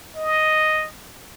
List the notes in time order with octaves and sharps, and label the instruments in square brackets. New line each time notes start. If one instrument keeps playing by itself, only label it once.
[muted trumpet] D#5